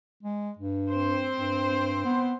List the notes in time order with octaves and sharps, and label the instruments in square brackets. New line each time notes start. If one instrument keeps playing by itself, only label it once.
[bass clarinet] G#3
G2
[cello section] C4 C5
[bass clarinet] G2
B3